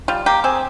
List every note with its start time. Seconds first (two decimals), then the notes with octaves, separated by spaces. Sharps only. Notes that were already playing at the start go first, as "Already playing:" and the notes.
0.08 G3 F4
0.26 A#3 G4
0.44 C4 G#4